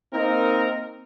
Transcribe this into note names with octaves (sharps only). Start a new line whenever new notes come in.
A#3 C4 D#4 A#4